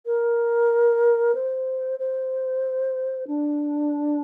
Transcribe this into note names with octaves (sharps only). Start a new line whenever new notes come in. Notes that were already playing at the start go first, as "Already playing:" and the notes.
A#4
C5
C5
D4